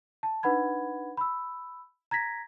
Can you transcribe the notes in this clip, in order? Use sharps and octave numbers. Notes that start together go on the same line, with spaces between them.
A5
D4 D#4 B4 F#5 B5 G#6
B5 E6
A#5 G#6 A#6 B6